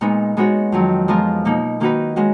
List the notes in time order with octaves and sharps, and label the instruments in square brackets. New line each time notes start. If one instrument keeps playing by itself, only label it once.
[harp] A#2 G#3 B3 D#4
G#3 B3 D#4 F#4 C#5
F2 D#3 F#3
F3 G#3 B3 F4 A#4
B2 A#3 D#4
D#3 A#3 D#4 F#4 B4
G#3 C#4 F#4